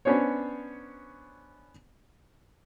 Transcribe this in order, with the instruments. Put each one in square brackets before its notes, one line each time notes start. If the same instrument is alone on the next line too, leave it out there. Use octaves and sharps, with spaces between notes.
[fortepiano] B3 C#4 D4 C5 C#5